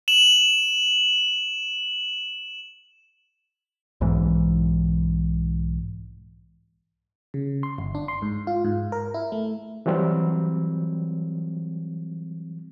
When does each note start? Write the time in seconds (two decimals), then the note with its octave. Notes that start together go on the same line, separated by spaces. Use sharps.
0.08 E7 F#7
4.01 B1 G#2 E3
7.34 C#3
7.63 C6
7.78 G1
7.95 D4
8.08 C6
8.22 G#2
8.47 F4
8.65 G#2
8.92 A#4
9.14 E4
9.32 A3
9.86 E3 F#3 G3 C4